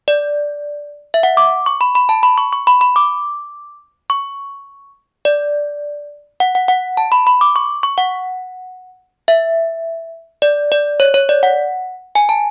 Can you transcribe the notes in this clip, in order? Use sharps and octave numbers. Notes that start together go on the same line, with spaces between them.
D5
E5
F#5
D6
C#6
B5
B5
A5
B5
C#6
C#6
B5
B5
D6
C#6
D5
F#5
F#5
F#5
A5
B5
B5
D6
C#6
C#6
F#5
E5
D5
D5
C#5
C#5
D5
F#5
G#5
A5